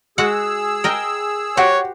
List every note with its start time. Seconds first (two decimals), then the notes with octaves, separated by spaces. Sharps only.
0.18 G#3 F#4 G#4 F#5 E6
0.84 A#4 D#5 G5
1.57 F#4 G4 C5 C#5 F#5